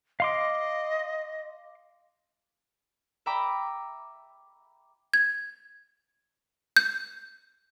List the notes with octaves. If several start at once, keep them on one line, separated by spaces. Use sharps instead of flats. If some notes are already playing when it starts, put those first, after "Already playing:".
D#5 F5 C6 D6
E5 G5 A#5 B5 D6
G#6
G6